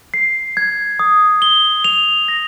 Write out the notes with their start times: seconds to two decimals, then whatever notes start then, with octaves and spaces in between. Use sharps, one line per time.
0.14 C7
0.57 G#6
0.99 D#6
1.42 G7
1.84 F7
2.28 A#6